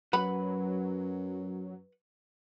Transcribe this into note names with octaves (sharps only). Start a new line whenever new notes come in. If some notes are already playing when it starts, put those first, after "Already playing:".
F#2 F#3 B4 F#5 B5